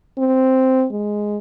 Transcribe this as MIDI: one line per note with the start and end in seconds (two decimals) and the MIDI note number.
0.18 0.86 60
0.91 1.38 56